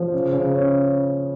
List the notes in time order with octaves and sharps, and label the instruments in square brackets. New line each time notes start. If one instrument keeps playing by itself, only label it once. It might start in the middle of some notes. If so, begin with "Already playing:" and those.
Already playing: [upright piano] F3
C#3
C#3
C#4